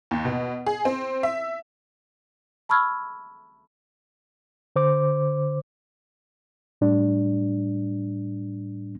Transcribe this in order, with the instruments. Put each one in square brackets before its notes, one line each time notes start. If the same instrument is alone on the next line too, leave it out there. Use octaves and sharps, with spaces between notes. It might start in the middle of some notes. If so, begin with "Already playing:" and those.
[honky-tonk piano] D#2
B2
G#4
C4
E5
[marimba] A5 B5 C#6 E6 F6 G#6
[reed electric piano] D3 C5 D6
A2 G3 D4